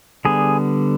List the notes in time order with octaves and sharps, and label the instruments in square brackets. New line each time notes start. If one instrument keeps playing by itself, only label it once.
[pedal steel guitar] D3 G3 B3 G#4